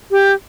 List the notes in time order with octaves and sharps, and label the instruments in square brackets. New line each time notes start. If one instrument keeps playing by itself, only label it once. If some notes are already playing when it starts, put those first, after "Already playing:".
[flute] G4